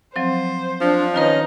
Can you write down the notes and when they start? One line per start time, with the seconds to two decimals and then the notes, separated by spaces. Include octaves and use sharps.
0.16 F3 F#3 C4 C5
0.81 F3 D4
1.14 D#3 C#4 D#4 F4 B4 D#5